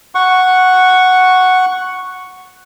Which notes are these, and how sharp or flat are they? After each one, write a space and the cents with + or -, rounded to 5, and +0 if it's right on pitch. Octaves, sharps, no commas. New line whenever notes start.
F#5 +0 C#6 +0